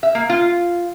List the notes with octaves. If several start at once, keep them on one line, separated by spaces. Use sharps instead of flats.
E5
A#3
F4